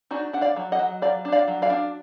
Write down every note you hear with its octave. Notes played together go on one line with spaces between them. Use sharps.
D4 D#4 F#4
D4 F#5
D5 F5
F#3
D#5 F#5
F#3
F#3 D5 F5
D4
D5 F5
F#3
D5 F5
D4